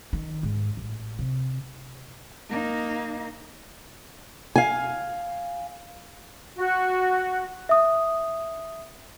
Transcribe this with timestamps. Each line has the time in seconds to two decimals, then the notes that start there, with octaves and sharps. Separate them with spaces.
0.13 D#3
0.43 G#2
0.77 A1
1.19 C3
2.49 A#3 D#4
4.56 F5 G#5
6.56 F#4
7.69 E5 D#6